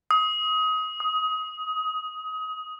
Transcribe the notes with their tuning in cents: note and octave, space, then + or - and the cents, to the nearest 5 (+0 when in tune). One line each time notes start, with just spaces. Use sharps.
D#6 +25
D#6 +10